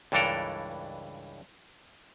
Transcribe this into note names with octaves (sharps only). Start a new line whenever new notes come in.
C#2 G2 E3 D4 A4 A#4